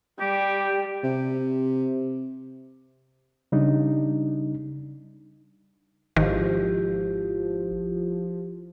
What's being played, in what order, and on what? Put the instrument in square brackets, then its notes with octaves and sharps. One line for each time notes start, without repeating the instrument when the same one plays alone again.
[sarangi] G3 [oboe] G4
[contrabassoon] C3
[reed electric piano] C#3 G3 D4 D#4
[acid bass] G#1 [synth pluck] D#3 [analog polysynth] F3 [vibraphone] E4 G4